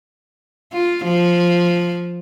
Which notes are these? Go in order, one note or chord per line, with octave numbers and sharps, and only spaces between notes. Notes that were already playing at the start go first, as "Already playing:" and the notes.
F4
F3